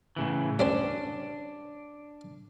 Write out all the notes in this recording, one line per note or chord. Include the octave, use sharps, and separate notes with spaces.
A2 C#3 E3
G3 C#4 D4 C5